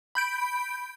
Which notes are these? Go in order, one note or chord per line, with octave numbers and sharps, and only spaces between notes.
B5 G6 D7